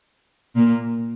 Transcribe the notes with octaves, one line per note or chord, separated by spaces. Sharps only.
A#2 A#3